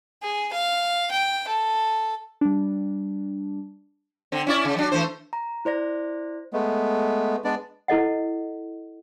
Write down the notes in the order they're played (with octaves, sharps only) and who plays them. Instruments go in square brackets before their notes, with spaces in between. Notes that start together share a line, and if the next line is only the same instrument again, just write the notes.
[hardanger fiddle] G#4
F5
G5
A4
[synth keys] G3 D4
[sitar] D3 C4
C#4 E4 D5
C#3
F#3 D4
E3 A3 C5
[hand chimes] A#5
E4 C5 D5 A#6
[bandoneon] G#3 A3 B3
G#3 B3 D4 D5
[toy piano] E4 A4 D#5 F#5